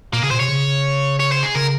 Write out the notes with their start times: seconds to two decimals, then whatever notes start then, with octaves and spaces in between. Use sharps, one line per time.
0.13 A#2 A#3
0.23 C#3 G#4
0.31 A#2 C5
0.40 C3 C#5
0.48 C#3
1.20 C#5
1.32 C5
1.43 G#4
1.55 C#3 A#4